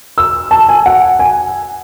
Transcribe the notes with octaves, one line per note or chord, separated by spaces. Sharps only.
E6
A5
G#5
F#5
G#5